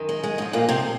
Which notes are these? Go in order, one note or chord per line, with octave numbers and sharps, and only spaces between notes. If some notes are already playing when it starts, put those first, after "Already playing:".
Already playing: F#2 D#3
G#3
G#3
G#2 F3 G#3
A#2 A#3
C3 C4